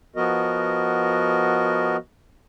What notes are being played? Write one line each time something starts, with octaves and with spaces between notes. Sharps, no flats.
F3 B3 F#4 A#4 D#5